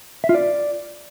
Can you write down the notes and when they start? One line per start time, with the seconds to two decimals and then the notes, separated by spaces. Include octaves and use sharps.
0.24 E5
0.29 F4
0.35 D5